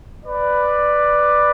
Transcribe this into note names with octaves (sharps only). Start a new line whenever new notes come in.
B4 D5